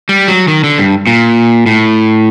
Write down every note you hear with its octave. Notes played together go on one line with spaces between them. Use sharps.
G3
F#3
D#3
D3
G2
A#2
A2